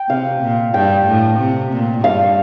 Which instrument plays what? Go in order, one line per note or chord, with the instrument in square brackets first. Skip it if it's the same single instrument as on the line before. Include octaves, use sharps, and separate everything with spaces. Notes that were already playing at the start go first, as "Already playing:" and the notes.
Already playing: [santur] G5
[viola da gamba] C3 [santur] F5
[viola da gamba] A#2
[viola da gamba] G2 [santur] G5
[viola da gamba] A2
C3
A#2
[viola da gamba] G2 [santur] F5